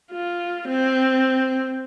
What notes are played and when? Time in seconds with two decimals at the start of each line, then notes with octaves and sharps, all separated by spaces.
0.12 F4
0.68 C4